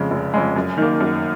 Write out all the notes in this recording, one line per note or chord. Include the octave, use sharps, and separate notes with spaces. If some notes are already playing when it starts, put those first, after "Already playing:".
Already playing: F2 C#3 G#3
F1
F2 C#3 G#3
F#2
D#3 A#3
F#2